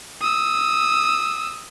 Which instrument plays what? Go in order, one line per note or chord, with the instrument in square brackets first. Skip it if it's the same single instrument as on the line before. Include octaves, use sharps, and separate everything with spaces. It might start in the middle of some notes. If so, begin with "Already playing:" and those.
[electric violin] D#6 E6